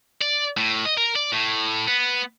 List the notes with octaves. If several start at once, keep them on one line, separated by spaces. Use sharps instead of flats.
D5
A2
D#5
A#4
D5
A2
B3